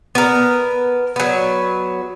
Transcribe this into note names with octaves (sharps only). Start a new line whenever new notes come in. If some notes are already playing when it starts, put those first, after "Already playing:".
B3 A#4
F#3 B3